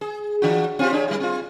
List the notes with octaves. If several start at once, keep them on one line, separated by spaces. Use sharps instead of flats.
G#4
E3 D4 F#4
C4 F4 G4
D4 G#4 C#5
G3 E4
C4 F4